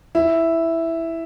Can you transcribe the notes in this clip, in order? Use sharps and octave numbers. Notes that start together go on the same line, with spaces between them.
E4